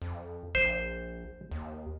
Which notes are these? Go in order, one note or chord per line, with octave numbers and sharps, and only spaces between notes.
F2
A#1 C5
D#2